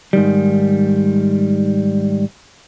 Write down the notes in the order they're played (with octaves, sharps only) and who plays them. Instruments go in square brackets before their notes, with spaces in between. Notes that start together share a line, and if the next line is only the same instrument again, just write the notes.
[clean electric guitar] G#2 D#3 G3